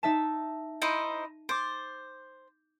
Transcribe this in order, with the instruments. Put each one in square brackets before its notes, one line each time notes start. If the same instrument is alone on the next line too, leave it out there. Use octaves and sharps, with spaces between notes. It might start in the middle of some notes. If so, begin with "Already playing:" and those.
[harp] D#4 E5 A5
[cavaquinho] D#4 E4 C5 [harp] D#7
[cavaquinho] C5 [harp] D6 A6 D7